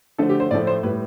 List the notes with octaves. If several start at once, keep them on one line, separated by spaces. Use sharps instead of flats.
D3 F3 A3 A4
G4
C5
A2 F3 A3 D5
C5
A2 G3 B4